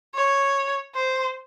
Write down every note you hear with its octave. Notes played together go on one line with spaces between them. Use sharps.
C#5
C5